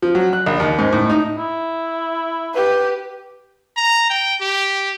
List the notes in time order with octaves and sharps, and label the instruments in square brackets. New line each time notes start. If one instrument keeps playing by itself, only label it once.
[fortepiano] F3
F#3
F#6
A#1
D#2
G#2
A2
D#4
[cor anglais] E4
[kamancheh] G4 B4
[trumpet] A#5
G5
G4